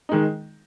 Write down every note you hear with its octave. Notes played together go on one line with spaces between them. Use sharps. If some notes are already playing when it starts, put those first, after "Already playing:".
D#3 G#3 D#4